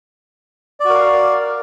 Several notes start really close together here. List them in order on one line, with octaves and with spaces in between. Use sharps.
D5 F#4 A#4 F5